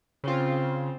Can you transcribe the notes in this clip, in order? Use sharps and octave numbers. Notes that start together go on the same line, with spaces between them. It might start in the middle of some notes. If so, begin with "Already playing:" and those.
C#3 C4 F4